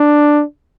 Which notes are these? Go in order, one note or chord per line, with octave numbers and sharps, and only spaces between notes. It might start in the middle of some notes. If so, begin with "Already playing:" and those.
Already playing: D4